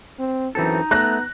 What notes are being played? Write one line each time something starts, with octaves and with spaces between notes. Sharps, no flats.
C4
F#2 E3 C4 D#4 A4
A3 B3 F#6 A#6